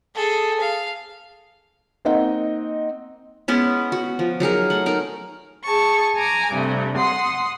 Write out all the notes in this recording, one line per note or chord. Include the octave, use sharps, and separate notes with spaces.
G#4 A4
F5
A#3 C4 D#4 D#5 F#5
G#3 B3 C#4 E4
F#4
F3
F#3 D#4 G#4 A#4
A3 F#5
D#4 A#4
G#4 A5 C#6
G#5 A#5 D6
G2 C3 A3
F#5 C6 D#6